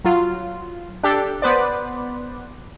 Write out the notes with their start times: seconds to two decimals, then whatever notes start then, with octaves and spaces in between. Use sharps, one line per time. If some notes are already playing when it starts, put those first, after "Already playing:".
0.04 F#3 F4
1.03 D4 G4 A4
1.42 B3 B4 C5 D5